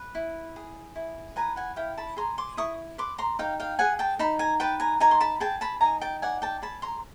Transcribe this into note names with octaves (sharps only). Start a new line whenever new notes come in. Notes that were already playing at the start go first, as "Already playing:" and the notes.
Already playing: B4
E4
G#4
E4
B4 G#5 A#5
F#5 G#5
E4 F5 G5
A5 B5
G#4 A#5 C6
C6 D6
E4 C#6 D#6
B4 C6 D6
A#5 C6
D#4 F5 G5
F5 G5
G#4 F#5 G#5
G5 A5
D#4 A5 B5
G#5 A#5
B4 G5 A5
G#5 A#5
D#4 G#5 A#5
C6
A5 B5
G#4 G5 A5
A5 B5
D#4 G#5 A#5
G5 A5
D5 F#5 G#5
G5 A5
G#4 A5 B5
A#5 C6